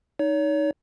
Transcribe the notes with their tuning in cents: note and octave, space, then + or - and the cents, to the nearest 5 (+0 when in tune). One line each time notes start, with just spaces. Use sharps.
D#4 +0 C#5 +35